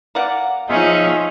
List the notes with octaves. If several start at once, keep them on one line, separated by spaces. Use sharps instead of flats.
A#3 D5 F#5
F3 C#4 D#4 F4 G#4 E5